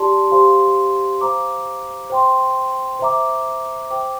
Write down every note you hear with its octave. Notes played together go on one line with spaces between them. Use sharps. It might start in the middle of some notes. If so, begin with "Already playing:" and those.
Already playing: G4 D5 A5 C6
G4 C5 F5 C6
C5 F5 A#5 D6
C5 G5 C6
C5 E5 A#5 D6
C5 G5 D6